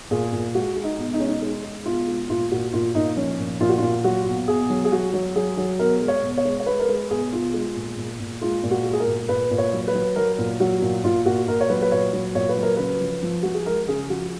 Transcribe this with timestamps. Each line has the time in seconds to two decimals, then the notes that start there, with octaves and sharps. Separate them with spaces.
0.11 A#2 G#4
0.33 A#2
0.55 G#3 F#4
0.76 G#3
0.84 D#4
0.98 B2
1.13 D#4
1.20 G#3 C#4
1.27 D#4
1.42 G#3 D#4
1.64 G#3
1.86 B2 F4
2.08 G#3
2.29 A#2 F4
2.51 A#2 F#4
2.73 A#2 F4
2.95 A#2 D#4
3.17 F3 C#4
3.39 A#2
3.61 A#2 F4
3.69 F#4
3.78 A#2 F4
4.04 F#3 F#4
4.26 B2
4.48 B2 G#4
4.70 F#3
4.85 G#4
4.92 F#3 F#4
5.13 F#3
5.36 F#3 G#4
5.57 F#3
5.79 B2 A#4
6.01 G#3
6.08 C#5
6.23 B2
6.38 C#5
6.45 G#3
6.60 C#5
6.66 G#3 B4
6.79 A#4
6.88 G#3 B4
7.10 B2 G#4
7.32 B2 F4
7.54 G#3
7.76 A#2
7.98 A#2
8.20 A#2
8.41 G#3 F4
8.63 A#2
8.71 F#4
8.85 G#3
8.93 G#4
9.00 A#4
9.08 A#2
9.29 A#2 B4
9.51 A#2
9.58 C#5
9.73 F#3
9.88 B4
9.94 F#3
10.16 F#3 A#4
10.38 A#2
10.60 F#3 F#4
10.82 A#2
11.04 A#2 F4
11.26 A#2 F#4
11.48 A#2 A#4
11.61 C#5
11.70 F#3 B4
11.82 B4
11.91 A#2 C#5
12.13 F#3
12.35 A#2 C#5
12.49 B4
12.57 F#3
12.63 A#4
12.77 C#3 B4
13.01 F3
13.23 F3
13.43 F3 F#4
13.54 G#4
13.66 G#3 A#4
13.88 C#3 G#4
14.10 F3 F#4